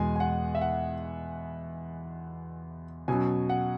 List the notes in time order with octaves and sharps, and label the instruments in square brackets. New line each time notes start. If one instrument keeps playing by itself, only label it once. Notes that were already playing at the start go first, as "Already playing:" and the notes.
Already playing: [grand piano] E2 B2 G#3 G#5
G#5
F#5
E5
F#5
B2 F#3 C#4 G#5
F#5